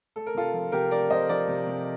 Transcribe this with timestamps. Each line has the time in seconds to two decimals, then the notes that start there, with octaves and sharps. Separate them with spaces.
0.16 A3 A4
0.27 A#4
0.35 C3 F4 A4
0.54 F3
0.72 C3 G4 A#4
0.91 A3 A#4 D5
1.10 C3 C5 D#5
1.29 F3 A#4 D5
1.48 C3
1.67 C3